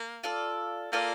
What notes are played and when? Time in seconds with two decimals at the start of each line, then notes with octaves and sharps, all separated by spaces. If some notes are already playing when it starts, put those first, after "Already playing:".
Already playing: A#3
0.24 F4 A4 D5
0.93 A#3 F4 A4 D5